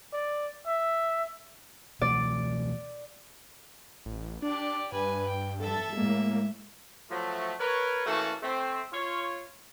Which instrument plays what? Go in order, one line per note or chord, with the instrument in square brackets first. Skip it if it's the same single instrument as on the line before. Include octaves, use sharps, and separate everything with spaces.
[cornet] D5
E5
[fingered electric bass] B2 E3 A3 [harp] D5
[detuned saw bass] A1
[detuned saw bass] D4 [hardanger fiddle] G4 D5
[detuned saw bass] G2 [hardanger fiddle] B4 G#5
[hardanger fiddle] G5
[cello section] A4 [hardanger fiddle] E5
[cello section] A2 G#3 [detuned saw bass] A#3
[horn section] F3 F#3 A3
A#4 B4 C#5
E3 A3 A#3 C#4 F#4 A5
A3 C4
F4 C#5